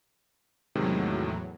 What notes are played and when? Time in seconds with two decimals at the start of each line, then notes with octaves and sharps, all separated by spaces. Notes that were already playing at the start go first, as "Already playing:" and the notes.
0.75 E2 A2 C3 D#3 F#3 G#3